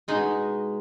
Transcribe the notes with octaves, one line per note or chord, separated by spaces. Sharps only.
B2 G#3 D#4